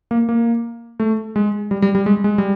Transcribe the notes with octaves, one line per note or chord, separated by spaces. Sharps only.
A#3
A#3
A3
G#3
G3
G3
G3
G#3
G#3
G3